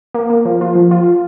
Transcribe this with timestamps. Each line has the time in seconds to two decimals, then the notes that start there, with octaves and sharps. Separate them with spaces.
0.14 A#3
0.30 A#3
0.45 F3
0.61 F4
0.75 F3
0.91 F4